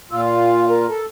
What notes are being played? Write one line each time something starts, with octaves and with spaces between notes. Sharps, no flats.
A#2 F4 E6
F5
A#4
A4